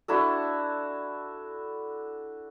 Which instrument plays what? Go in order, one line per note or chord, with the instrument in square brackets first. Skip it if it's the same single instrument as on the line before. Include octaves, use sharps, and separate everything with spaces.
[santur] D4 E4 F#4 A4